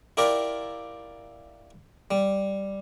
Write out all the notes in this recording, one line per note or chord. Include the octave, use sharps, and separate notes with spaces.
E4 F4 G4 A#4 D5 E5
G3